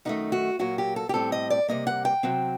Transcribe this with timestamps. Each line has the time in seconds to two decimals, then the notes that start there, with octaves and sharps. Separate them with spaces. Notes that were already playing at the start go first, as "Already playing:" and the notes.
0.05 F#2 D#3 A3 D#4
0.32 F#4
0.59 A#2 F#3 A#3 F#4
0.78 G4
0.96 A4
1.09 G4
1.14 A2 G3 C4 A4
1.32 D#5
1.50 D5
1.68 C3 G3 A#3 D#5
1.87 F#5
2.05 G5
2.23 C3 F#3 C4